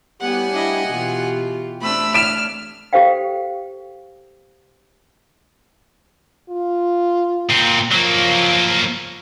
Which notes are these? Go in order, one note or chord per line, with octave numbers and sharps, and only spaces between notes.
A2 G3 B3 G4 F#5 G#5
D4 E4 D#5
B2 E3 F4 G4
A3 C4 D4 B5 E6
D4 F6 D7 E7
G4 A4 C5 F5 G5
F4
A#2 C4
F3 F#3 A#3